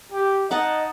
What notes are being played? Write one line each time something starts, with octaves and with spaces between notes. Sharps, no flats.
G4
D#4 D#5 F#5 A5